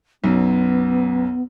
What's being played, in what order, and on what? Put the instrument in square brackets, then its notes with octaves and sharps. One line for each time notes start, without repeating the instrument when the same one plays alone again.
[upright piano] B1 F#2 [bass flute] B3